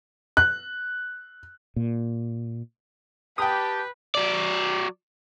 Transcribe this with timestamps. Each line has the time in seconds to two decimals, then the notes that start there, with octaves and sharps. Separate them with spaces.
0.37 F#6
1.76 A#2
3.38 G4 B4 G5 A5 D#6
4.15 F#3 D5